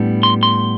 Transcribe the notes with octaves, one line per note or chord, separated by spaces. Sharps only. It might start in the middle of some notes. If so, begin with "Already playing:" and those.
Already playing: A2 G3 B3 D4
C6
C6